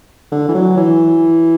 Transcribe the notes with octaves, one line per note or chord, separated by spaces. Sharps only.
D3
E3
F#3
E3